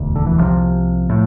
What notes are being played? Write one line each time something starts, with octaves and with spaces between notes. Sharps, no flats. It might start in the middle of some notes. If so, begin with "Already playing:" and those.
Already playing: E1 D2
D3
E3
C2 C3 F3
A2